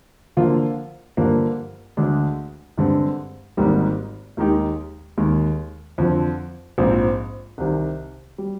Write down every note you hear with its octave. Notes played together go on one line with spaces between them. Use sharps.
D3 F3 A#3 F4
G2 D3 F3 A#3
D2 D3 G#3 D4
G2 D3 G#3 C4
G#1 G#2 G3 A#3 D#4
D#2 D#3 G#3 D#4 G4
D#2 D#3 G#3
F2 D3 F3
A#1 G#2 F3 C4
C2 C3 D#3
G3